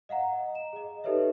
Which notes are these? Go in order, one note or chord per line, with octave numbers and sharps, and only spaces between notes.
D#5 F5 F#5 A#5
E7
G#4 D#5
D#4 G4 A4 B4 C#5 E5